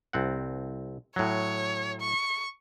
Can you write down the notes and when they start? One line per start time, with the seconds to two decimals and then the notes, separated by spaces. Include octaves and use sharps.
0.13 C2 C4 F#5
1.16 A2 F#3 C#5
2.01 C#6